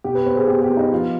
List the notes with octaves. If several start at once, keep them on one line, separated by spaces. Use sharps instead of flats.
B2 G4
B4
B3 C5
G#4
B3 G4
G4
B3
D#4
F3 F4